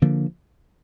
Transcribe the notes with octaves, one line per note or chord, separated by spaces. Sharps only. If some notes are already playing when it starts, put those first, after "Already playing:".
D3 F3 A#3 D4